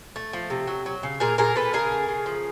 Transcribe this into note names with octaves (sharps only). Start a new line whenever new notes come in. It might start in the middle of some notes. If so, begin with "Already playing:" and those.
A3
F3
C3
F#3
F#3
C#3
A#2 G#4 A#4
A#2 G#4 A#4
A#2 A4 B4
C#3 G#4 A#4
A3
C#3
F3